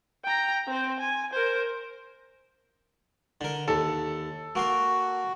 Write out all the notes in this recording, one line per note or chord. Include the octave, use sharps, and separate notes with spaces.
G5 A#5
C4 C5
G#5
A#4 C5
D3 A#4
D#2 A4
A#3 F#4 A#4 C6